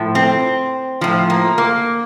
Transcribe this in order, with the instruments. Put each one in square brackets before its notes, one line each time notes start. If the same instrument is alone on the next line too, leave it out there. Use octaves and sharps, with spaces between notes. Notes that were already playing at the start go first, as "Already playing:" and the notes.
Already playing: [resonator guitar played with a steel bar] A2 F3
C4
A2 F3
A#3
A#3